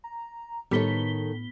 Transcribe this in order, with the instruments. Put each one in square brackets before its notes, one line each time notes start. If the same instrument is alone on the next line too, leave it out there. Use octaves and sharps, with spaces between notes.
[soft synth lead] A#5
[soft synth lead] A2 [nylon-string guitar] D#3 A4 C#5 [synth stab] G3 [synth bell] B3 B6 G7